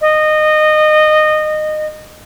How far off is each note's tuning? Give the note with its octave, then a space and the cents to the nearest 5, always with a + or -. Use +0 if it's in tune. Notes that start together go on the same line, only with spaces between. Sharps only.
D#5 -20